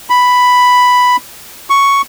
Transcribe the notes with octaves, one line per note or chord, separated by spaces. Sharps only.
B5
C#6